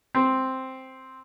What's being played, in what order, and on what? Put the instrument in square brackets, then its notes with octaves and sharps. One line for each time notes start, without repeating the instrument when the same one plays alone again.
[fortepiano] C4